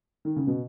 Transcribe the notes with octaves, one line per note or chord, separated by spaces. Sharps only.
D#3
C#3
B2